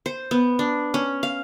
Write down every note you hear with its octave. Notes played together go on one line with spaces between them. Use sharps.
C5
B3
D4
C#4
F5